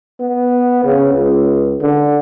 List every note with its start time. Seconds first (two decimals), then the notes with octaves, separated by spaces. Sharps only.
0.20 B3
0.84 C#3
1.14 C#2
1.82 D3